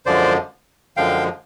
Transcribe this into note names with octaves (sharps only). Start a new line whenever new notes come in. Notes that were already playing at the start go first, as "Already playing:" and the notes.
F#2 D3 F3 G#3 C5 D5
F#2 D3 F3 G#3 F5 G5